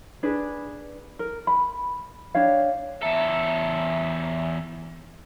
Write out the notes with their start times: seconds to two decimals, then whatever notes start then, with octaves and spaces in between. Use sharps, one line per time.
0.23 D4 G#4 B4
1.19 A#4
1.47 B5
2.35 D4 G4 C#5 F5
3.02 E2 A4 C#5 E5 A#5